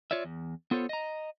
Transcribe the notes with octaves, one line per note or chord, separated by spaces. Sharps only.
F4 C#5 D5 E5
E2
B3 F4 A4 C5 C#5
D#5 A#5